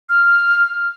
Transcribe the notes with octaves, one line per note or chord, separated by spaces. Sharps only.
F6